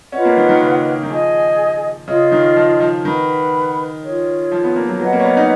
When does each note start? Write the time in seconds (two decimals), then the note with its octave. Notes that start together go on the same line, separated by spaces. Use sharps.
0.12 C#4 F4 B4 D#5 F#5
0.25 A#3
0.37 D#3
0.49 D#3
0.61 C#3
1.03 D#3
1.10 F3 G#4 D#5 G#5
2.08 C#3 F4 G#4 D#5
2.32 D#3
2.56 F3
2.80 F3
3.05 D#3 B4 F#5 B5
4.02 F4 G#4 C#5
4.52 F3
4.64 B3
4.76 A#3
4.88 F#3
5.00 F#3 B4 D#5 F#5
5.13 A#3
5.20 C#4
5.25 B3
5.37 D#4